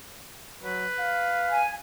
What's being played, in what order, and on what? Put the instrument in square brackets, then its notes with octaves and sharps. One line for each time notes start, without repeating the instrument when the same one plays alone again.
[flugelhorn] F#3 [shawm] B4
[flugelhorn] F5
[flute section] G#5